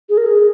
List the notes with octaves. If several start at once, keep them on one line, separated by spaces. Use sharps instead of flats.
G#4
A#4
G#4